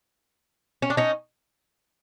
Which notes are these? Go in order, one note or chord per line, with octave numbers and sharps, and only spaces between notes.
C#4
D4
C#4 D#4